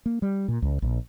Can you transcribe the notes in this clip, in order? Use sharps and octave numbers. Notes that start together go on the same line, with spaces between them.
A#3
G3
A#2
C#2
A#1